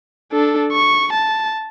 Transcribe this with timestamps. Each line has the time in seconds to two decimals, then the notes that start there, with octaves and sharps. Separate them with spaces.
0.32 D4 A4
0.72 C#6
1.12 A5